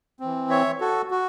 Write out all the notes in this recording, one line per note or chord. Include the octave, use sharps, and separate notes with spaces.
E3 C4
C#5 E5
F#4 A4
F#4